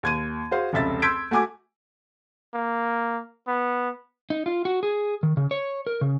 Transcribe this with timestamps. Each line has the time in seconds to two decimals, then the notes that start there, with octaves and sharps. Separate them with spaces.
0.03 D#2 G#6 D#7
0.51 F#4 G#4 C5 F5
0.73 F1 C#2 E5 A6
1.02 C6 E6 G6 G#6 B6 D7
1.31 A3 F#4 G#5 D6 G#6
2.54 A#3
3.47 B3
4.30 D#4
4.46 F4
4.65 F#4
4.83 G#4
5.23 D#3
5.37 C#3
5.51 C#5
5.87 A#4
6.01 C#3